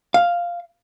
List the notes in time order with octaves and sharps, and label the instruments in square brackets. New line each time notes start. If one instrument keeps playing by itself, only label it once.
[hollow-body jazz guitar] F5